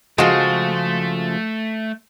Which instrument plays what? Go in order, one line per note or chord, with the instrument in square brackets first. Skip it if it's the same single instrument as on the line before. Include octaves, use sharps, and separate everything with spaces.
[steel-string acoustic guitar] C#3 F3 [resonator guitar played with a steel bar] G#3 F4 F#4 [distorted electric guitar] A3